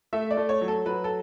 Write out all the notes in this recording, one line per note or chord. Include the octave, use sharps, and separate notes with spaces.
A3 E5
D5
A3
C#5
F#3
A4
F#3 B4
A4